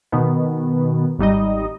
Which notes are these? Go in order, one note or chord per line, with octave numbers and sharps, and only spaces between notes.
B2 D#3 B3
G#1 G3 D#4 D#5